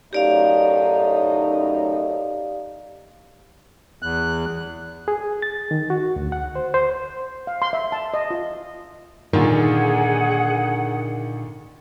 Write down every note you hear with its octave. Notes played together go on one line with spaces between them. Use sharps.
F#2 A2 D#4 G4 D5 F5
E2 F#6
G#4
A6
D#3
F#4
D2
F#5
C5
C5
F5
C6
E5
A5
D#5
F4
A#2 D3 D#3 A#3 G#4 F#5